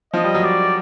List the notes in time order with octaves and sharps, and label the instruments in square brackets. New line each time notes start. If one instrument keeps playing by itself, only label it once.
[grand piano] F3 [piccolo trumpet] D#5
[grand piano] G3
F#3
[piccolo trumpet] D5